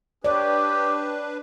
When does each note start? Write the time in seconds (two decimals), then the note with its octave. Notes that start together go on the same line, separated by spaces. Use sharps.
0.24 D4 G4 B4 C#5 D5